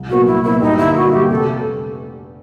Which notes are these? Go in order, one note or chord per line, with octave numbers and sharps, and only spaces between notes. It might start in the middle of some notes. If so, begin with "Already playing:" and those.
Already playing: C2
A#2 F#3 B3 F#4
C2 E4
A#2 F#3 B3 E4
G2 D#4
D3 G3 A#3 E4
G2 F#4
D3 G3 A#3 G4
F1 A4